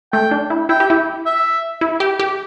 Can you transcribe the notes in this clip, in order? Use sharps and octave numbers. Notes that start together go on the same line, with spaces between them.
A3 G5
D4
E4
E4 G5
G4
E4
E5
E4
G4
G4